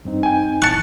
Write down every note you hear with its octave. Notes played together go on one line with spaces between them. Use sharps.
G2 C4 D#4
G5 G#5
E3 A5 C#6 F#6 C#7